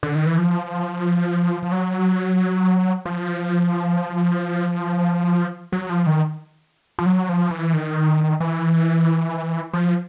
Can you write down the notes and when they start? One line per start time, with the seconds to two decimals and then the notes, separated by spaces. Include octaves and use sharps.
0.03 D3
0.15 D#3
0.26 E3
0.38 F3
1.63 F3
1.72 F#3
3.06 F3
5.72 F#3
5.89 F3
6.06 D#3
6.99 F3
7.06 F#3
7.29 F3
7.51 E3
7.73 D#3
8.40 E3
9.74 F3